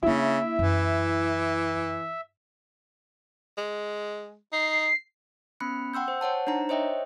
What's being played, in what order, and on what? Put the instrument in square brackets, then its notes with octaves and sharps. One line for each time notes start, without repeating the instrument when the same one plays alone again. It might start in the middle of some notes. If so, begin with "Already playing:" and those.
[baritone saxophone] C#3 [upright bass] A#3 D4 [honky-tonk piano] E4 [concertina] E5
[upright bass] F#2 [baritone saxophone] E3
[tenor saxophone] G#3
[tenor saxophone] D#4 [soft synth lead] C7
[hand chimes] B3 C#4 B5 F#6 C#7
F#5 G5 C6 E6 G6
C5
C5 C#5 F#5 A5
D4 D#4 C5 A#5
C5 C#5 D#5 E5 G5